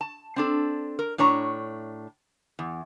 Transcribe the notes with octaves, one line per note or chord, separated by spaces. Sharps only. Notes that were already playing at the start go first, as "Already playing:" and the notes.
A5
C4 D4 A4
A#4
A2 D4 C#5 A#5
E2